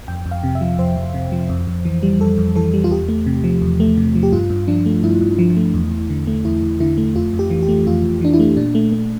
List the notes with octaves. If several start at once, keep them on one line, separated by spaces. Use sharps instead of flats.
F2 G5
F2
F5
C3
E5
F3
F2 C5
F2
C3
F3
F2
F2
E3
G3
F2 A4
F2
E3 A4
G3
F4
E2 G4
A3
C3
F3
E2
A3
C3
F3
G4
G2 F4
G2
F3 D4
A3
G2 E4
G2
F3
A3
E2
E2
D3
A3
E2 E4
E2
D3 E4
A3
F2 F4
F2
G4
E3
G4
A3
F2 F4
F2
E3 D4
E4
A3
A#2 D4
A3
A3